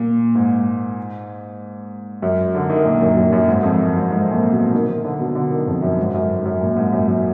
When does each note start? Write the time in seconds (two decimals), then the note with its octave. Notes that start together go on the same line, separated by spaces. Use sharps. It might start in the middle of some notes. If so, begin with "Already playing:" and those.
Already playing: A#2
0.35 G#2
2.22 F#2
2.55 D3
2.70 D#3
2.85 A#2
3.01 F#2
3.17 F#2
3.32 F#2
3.48 G#2
3.63 F2
3.79 F#2
3.95 G#2
4.11 G#2
4.31 A#2
4.52 B2
4.73 D#3
4.89 D#3
5.05 D3
5.20 B2
5.35 D3
5.51 D#3
5.67 F2
5.82 F#2
5.98 G#2
6.14 F#2
6.39 G#2
6.45 F#2
6.61 A#2
6.77 G#2
6.92 F#2
7.08 F#2